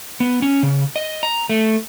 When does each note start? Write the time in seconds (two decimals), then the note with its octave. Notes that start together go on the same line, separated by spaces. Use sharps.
0.20 B3
0.42 C#4
0.63 C#3
0.96 D#5
1.23 A#5
1.49 A3